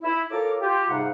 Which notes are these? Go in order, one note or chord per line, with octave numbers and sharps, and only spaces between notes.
E4
F4 A4 A#4 C#5 A#5 D6
F4 G4
G#2 C3 G3 D#4 F5 F#5